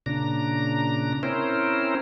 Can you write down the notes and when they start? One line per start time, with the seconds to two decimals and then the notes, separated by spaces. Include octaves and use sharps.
0.06 A#2 C#3 D4 A#5
1.23 C4 C#4 E4 A#4 C5